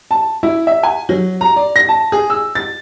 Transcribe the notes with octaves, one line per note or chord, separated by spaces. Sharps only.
A5
E4
E5
G#5
F#3
A#5
D5
A#6
A5
G#4
E6
A6